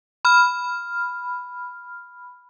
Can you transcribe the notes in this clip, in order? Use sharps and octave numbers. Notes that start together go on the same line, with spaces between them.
B5 F6